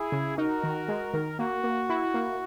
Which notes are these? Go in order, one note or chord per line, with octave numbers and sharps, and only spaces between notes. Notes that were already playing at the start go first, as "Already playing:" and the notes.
Already playing: E4 G#4
C#3
D#4 F#4 A#4
D#3
G#3
D#3
A#3 F#4
A#3
E4
A#3